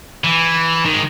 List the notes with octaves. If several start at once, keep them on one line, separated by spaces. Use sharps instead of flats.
E3
D#3
G#3